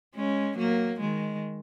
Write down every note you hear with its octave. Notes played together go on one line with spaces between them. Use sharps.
G#3 C#4
F#3 A#3
D#3 G#3